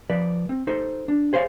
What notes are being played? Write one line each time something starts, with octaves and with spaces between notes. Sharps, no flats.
F3 B4 D5
C4
D#4 A4 C5 C6
D4
G#4 C5 C#5 F5